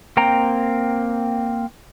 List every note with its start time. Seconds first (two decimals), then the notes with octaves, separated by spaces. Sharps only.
0.17 A#3 C4 G5 A#5